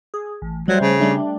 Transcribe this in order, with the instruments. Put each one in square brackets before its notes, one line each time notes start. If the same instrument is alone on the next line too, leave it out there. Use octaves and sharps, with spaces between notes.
[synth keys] G#4
A1
[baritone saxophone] F#3 [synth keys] G3 A3 C5
[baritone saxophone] C#3
[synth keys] G3 A3 D4